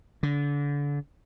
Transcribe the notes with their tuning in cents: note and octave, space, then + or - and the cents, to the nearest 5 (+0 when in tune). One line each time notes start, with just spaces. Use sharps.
D3 -30